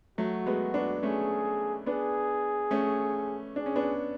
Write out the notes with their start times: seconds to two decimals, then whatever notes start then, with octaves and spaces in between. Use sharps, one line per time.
0.18 F#3 A3 F#4
0.46 G#3 B3
0.74 B3 D4
1.02 A3 C#4 G#4
1.86 B3 D4 G#4
2.71 A3 C#4
3.56 D4 G#4
3.66 C#4
3.76 B3 D4